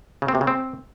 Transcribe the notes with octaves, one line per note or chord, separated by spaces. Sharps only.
C#3
C4
C3
C#3
C4